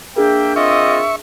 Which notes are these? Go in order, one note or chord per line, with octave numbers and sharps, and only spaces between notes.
A#3 D4 G#4 A#4 E5 G5
C4 F4 D#5 E5 C#6